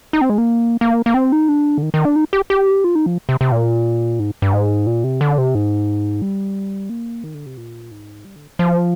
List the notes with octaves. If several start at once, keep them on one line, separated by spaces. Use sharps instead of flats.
D#4
C4
G#3
A#3
A#3
A#3
C4
D#4
D4
D3
D#3
D#3
D4
D#4
G4
G4
F4
D#4
F3
C3
C3
A#2
G#2
G2
G#2
A#2
C3
D3
C3
G#2
G3
A#3
D#3
D3
C3
A#2
G#2
G3
D3
F3